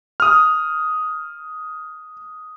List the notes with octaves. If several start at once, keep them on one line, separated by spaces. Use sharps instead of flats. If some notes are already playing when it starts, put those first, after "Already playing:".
D#6 F6